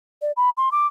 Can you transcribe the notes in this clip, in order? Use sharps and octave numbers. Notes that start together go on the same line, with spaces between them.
D5
B5
C6
D6